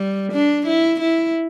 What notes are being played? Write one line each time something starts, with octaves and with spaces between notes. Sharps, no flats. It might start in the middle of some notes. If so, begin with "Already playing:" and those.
Already playing: G3
D4
E4
E4